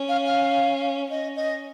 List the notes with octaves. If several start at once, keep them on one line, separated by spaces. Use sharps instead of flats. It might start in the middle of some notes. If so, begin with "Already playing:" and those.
Already playing: C#4
F5
F5
C#4 D#5
D#5